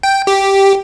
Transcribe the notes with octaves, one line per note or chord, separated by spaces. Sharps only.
G5
G4